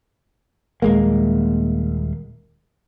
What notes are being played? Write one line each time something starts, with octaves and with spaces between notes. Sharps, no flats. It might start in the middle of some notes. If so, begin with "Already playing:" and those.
D#1 G#3 A#3